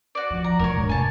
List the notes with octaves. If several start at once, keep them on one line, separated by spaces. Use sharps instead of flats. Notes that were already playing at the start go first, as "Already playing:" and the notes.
F#4 D5
F3
A#5
E1 A#4 C#5
G#2
C3 G#5 A5